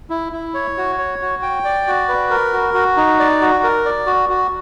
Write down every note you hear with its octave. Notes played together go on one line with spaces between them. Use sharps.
E4
E4
C#5
F#4
C#5
F#4
G5
D5
F#4
B4
A#4
F#4
F#4
D#4
D5
F#4
A#4
D5
F#4
F#4